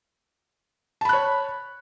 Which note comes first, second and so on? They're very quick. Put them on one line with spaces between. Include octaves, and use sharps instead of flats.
A5 B5 F#6 C#5